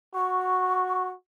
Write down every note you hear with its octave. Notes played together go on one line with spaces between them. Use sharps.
F#4 C#6